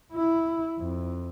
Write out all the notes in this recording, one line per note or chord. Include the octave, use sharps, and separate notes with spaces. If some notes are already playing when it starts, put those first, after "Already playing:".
E4
F2